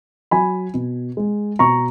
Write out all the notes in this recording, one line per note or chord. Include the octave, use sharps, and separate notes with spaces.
F#3 G#5 B5
B2
G#3
B2 A#5 C#6